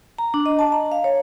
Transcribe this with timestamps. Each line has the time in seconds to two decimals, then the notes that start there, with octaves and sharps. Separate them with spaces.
0.18 A#5
0.34 D4
0.46 D#5
0.59 A5
0.72 A#5
0.92 F5
1.04 C#5